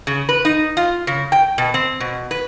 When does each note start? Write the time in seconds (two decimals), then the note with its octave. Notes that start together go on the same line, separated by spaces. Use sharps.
0.07 C#3
0.29 B4
0.45 D#4
0.77 F4
1.07 C#3
1.32 G5
1.58 B2
1.74 C4
2.00 B2
2.31 B4